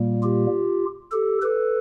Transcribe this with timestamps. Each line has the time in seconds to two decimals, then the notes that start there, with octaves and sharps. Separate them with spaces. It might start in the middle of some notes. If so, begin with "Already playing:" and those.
Already playing: A#2 G3 A#3
0.23 F4 G4
1.11 G4 A4
1.42 A4 B4